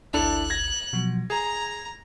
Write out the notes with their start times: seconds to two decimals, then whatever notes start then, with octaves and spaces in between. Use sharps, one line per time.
0.14 G#1 D2 D4 E4 A4 F#6
0.50 G#6 A#6
0.93 B2 F3 F#3
1.30 G#4 A#5 G#6